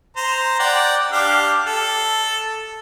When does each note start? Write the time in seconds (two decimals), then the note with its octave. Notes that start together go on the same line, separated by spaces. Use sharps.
0.17 C5 A#5
0.60 D5 F#5 G5
1.12 D4 G4 F5
1.67 A4